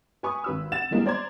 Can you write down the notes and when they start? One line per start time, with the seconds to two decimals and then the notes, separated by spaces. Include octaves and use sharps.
0.23 B4 G#5 C#6 D#6
0.44 G#1 B4 E6
0.72 F#5 A6 E7
0.91 E3 G3 G#3 A#3 B3 F4
1.06 C5 D5 A#5 C6 G#6